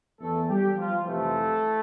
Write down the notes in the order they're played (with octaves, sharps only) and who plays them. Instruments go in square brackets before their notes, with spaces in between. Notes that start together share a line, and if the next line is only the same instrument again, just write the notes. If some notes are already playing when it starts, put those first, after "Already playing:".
[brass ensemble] E2 E3 A3 A4
G3 G4
F3 F4
F2 C3 E3 A3 A4